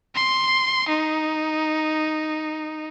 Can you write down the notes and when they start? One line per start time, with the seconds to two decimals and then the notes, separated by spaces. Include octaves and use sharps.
0.15 C6
0.89 D#4